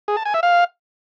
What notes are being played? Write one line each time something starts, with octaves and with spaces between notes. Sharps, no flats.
G#4
A5
G#5
E5
F5